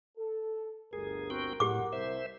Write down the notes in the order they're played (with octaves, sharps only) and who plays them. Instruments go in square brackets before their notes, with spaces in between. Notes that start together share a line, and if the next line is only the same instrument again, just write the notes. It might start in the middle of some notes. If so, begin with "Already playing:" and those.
[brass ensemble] A4
[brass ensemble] G1 D2 G2 [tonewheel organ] G#4 [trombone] A#4
[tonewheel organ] C4 F#4 G5
[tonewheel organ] A2 [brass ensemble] F#3 F#5 [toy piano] G4 D6
[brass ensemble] C2 [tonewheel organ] C5 E5